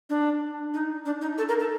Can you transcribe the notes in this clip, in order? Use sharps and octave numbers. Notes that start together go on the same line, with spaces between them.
D4
D#4
D4
D#4
A4
A#4
A4